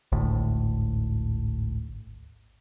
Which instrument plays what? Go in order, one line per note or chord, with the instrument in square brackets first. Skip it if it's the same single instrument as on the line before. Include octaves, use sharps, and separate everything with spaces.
[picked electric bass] G#1 D2 A2